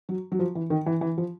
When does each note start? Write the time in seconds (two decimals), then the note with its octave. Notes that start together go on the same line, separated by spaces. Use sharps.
0.09 F#3
0.32 F#3
0.39 F3
0.55 E3
0.70 D#3
0.86 E3
1.01 E3
1.18 F3